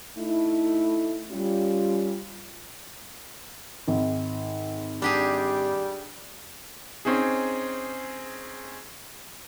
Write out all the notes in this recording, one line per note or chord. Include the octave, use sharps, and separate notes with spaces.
A3 D#4 E4
G3 C#4 F4
G#1
G3 D4 G4 G#4
C4 C#4 D#4 G#4